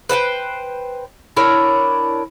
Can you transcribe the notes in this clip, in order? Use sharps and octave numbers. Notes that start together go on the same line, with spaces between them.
B4 C5 F#5 G5
D4 E4 A#4 C#5